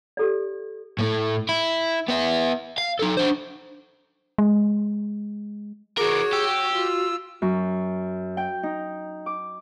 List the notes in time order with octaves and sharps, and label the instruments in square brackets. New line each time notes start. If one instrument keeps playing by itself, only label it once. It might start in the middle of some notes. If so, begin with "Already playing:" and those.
[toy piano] G4 A4 D5
[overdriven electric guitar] A2 A3
E4
B3 E5
F5
D#4 A4
D4 C5
[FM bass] G#3
[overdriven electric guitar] E3 A#4 [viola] F#4 C#5 [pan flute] G#4 [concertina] D6
[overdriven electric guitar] G4 [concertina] E6
[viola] F4 [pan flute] F#4
[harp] F#2
G5
D#4
D6